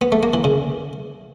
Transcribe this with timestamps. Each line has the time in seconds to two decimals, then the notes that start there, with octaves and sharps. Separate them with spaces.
0.01 B3
0.12 A3
0.23 A#3
0.34 E3
0.44 C#3